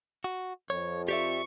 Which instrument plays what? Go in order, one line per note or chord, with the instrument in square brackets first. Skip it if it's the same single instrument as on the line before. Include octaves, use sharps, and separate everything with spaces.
[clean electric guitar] F#4
[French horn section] F2 [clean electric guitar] C#5
[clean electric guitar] G4 D5 E5 [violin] C#6